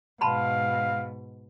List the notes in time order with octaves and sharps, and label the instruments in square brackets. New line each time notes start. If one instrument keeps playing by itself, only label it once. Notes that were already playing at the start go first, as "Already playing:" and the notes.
[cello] G#2 B2 [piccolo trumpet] F5 [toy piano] A5 B5 C6